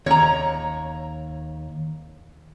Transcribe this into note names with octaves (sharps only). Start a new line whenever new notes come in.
D#2 C#5 A#5